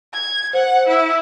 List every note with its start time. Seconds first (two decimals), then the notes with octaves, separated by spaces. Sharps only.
0.14 G#6
0.53 C5 F#5
0.88 E4